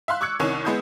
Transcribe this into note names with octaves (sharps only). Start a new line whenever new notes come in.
E5 F5 C6 F#6
C#6 D6 E6 F#6 G#6 C#7
C2 D#3 C#4 C#6
G#3 B3 E4 D#6 G6